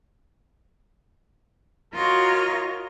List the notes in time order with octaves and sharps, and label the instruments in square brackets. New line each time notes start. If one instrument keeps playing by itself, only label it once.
[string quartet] F4 F#4 A#4 C#5 D#5